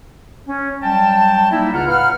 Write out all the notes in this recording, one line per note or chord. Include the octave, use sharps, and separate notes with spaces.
C#4
F#3 G3 G5 A5
G3 A#3 D#4 E4
C#2 C#3 F4 F#5 A#5 F6
A2 B4 F5 F#5 F6